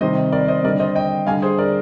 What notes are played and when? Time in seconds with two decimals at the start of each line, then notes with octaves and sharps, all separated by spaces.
0.01 C3 D#3 G3 C5 D#5
0.32 A#4 D5
0.48 C5 D#5
0.64 G3 A#4 D5
0.68 D3
0.80 C5 D#5
0.95 D#5 G5
1.26 G3 F5 G#5
1.30 D3
1.42 G#4 C5
1.58 A#4 D5